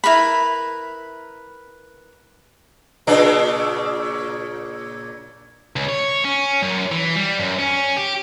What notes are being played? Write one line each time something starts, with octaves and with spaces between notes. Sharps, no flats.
E4 A#4 B4 B5
A#2 C#3 D4
C#2
C#5
C#4
F#2
E3
G3
F#2
C#4
G4